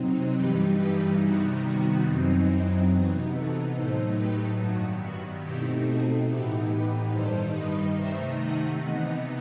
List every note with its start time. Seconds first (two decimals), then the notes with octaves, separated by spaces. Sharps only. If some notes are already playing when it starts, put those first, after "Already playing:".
Already playing: C3 F#3 C4 D#4
0.34 G2 E3 G3 D#4 G4 B4
0.76 G4 B4
1.19 C3 D#3 G3 B3 D#4 F#4
1.62 F#4
2.04 F#2 F#3 C4 D#4
2.46 E4
2.89 C3 E3 B3 D#4 F#4
3.31 F#4 A4
3.73 A2 F#3 A3 D#4 A4 C5
4.15 G4 B4
4.58 G2 D#3 F#3 B3 F#4
5.00 F#4
5.42 B2 A3 C4 D#4 E4 G4
5.85 F#4 A4
6.27 A2 E3 B3 D#4 E4 G4
6.69 G4 B4
7.11 G2 D#3 G3 D#4 A4 C5
7.54 B4 D#5
7.96 C3 D#3 A3 D#4 C5 E5
8.38 D#5 F#5
8.81 C3 E3 B3 D#4 D#5 F#5